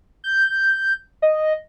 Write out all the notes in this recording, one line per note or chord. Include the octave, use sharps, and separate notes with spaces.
G6
D#5